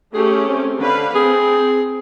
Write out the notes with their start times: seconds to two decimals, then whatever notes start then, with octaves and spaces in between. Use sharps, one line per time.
0.14 A3 C#4 G4 G#4
0.48 C4
0.79 D3 B4 F5
1.15 C4 G#4